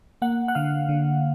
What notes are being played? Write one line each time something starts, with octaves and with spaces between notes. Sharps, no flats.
A#3 F#5
F#5
D3 F5
D3